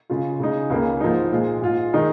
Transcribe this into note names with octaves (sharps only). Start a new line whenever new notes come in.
C#3 G#3 F4
C#3 G#3 D#4
C#2 C#3 A#3
G#2 F3 A#3 D#4
A#2 G#3 F4
G#2 G#3 F4
D#3 G#3 D#4